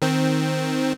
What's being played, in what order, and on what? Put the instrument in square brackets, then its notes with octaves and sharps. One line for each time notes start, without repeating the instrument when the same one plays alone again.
[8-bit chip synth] D#3 C4